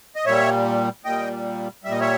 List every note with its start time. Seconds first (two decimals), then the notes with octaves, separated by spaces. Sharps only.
0.16 D#5
0.25 A#2 G3 C#5 E5
1.05 A#2 G3 D#5 G5
1.84 G3 E5
1.88 A#2 D#5
2.01 C#5 E5